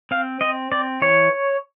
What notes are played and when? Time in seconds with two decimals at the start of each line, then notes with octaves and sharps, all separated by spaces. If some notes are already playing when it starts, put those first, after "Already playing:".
0.11 C4 F5
0.41 C4 D#5
0.72 C4 D5
1.02 E3 C#5